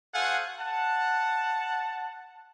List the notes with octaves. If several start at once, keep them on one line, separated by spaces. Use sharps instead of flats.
F#4 A4 C5 F5 F#5 G#5
F#5 A5